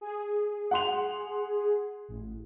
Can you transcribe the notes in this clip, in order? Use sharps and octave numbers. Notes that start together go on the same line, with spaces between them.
G#4
F#5 C6 F7
A1